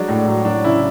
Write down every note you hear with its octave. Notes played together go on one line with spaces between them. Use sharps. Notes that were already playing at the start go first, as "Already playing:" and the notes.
Already playing: F#3 G#3 D4
A2
F#3
F#3 D4
C#3 E4